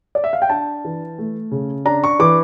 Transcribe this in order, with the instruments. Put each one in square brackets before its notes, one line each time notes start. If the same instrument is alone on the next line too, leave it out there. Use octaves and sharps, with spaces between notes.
[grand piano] D5
E5
F5
G5
D4 A5
E3
A3
C#3
D4 A#5
C#6
E3 D6